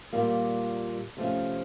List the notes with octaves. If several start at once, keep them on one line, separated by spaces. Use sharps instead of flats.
A#2 G3 A#3
C3 F3 A3 C#4